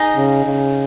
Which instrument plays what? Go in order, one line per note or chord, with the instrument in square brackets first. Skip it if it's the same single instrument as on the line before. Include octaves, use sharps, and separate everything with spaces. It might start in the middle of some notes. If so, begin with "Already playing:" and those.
Already playing: [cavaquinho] D#4 G#4 D#5
[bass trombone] C#3
C#3